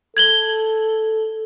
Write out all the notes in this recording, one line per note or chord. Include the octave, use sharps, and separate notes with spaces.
A4 G#6 F#7 G7